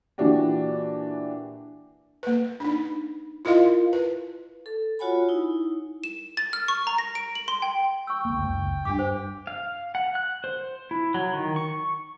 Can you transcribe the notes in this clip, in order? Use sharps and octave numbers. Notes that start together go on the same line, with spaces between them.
A#2 E3 D4 F#4 G4
A#3 B4
D4 D#4
E4 F4 A#4 D#5 F5
B4
A4
F4 F#4 C#5 F#5 G#5 B5
D#4 E4
E7
A6
F6
C#6
A#5
A#6
D7
F#7
C6
G5
G5 C#6 E6
C#2 A#3
F#1 C#2
G2 D4 G4 D6
C5
F5
F#5
F#6
C5
E4
F#3
D#3
C#6